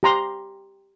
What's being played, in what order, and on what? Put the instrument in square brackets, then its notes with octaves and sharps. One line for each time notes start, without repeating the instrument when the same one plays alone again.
[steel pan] G4 A#5 C6